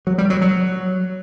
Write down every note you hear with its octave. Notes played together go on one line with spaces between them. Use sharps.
F#3
G3
F#3
F#3